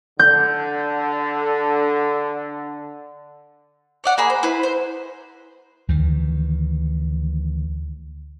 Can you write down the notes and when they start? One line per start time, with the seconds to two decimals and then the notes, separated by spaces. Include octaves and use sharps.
0.19 D3 G6
4.04 C#5 D5 F#5
4.18 A#3 G#4 B5
4.30 C5
4.43 E4 B4 C5
4.63 C5
5.89 D2 D#3 E3